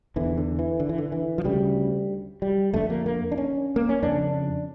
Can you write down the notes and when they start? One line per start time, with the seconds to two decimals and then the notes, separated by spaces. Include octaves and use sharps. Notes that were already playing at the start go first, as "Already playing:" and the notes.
0.16 E2 D3 E3
0.37 D3
0.59 E3
0.80 D3
0.89 E3
0.98 D3
1.12 E3
1.38 F3
1.45 D2 C#3 G3
2.42 G3
2.74 F2 D3 A3
2.90 A#3
3.06 A#3
3.32 D4
3.38 C#4
3.76 A#3
3.89 C#4
4.02 F2 C#3 D4